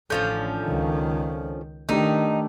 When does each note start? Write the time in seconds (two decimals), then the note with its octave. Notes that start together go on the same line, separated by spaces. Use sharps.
0.10 A1 D3 F3 C#4 G6
0.63 C#2 D#3
1.89 D#3 A3 D4 D#4 G4